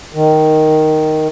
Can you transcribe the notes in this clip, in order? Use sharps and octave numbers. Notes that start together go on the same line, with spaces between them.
D#3